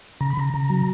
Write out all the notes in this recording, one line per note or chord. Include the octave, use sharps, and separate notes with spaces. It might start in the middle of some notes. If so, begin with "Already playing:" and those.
C#3 A#5
B5
C#3 A#5
C#3
F#3